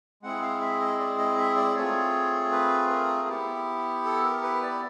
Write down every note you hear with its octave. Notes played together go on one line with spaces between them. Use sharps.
G#3 C4 E4 G#4 F#5
F5
E5
D#5
D5
D#5
E5
D5
A3 C4 F4 G#4 C#5
B4
A#4
B3 E4 G4
A4
A#4
B4
D5